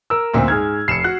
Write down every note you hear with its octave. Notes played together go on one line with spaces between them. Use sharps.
A#4 E6
F#1 D2 A#2 C4
G#2 G#4 F6 G#6
F1 C7 C#7 E7
F#4 F#6